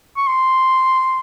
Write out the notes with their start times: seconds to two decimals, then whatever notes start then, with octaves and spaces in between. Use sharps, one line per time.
0.17 C#6
0.27 C6